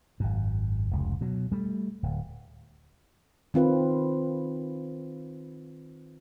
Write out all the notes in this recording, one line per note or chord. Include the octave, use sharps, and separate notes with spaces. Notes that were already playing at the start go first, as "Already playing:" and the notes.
G#1 F#2
F1 C#2
B2 F#3
G3 A3
D1
D#3 C4 F4 B4